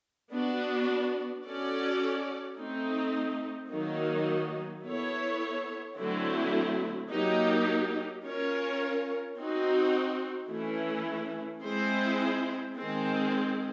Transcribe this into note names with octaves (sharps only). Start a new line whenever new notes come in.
B3 D4 F#4
C#4 F#4 A4 D5
A3 C4 D#4
D#3 F#3 A#3 D#4
B3 E4 A4 C#5
D3 F#3 A3 C4 E4
F#3 A#3 D#4 G4
C#4 F4 A#4 C#5
C4 D#4 F#4
E3 A3 C#4 E4
G#3 C4 E4 G#4 C5
D#3 G#3 C4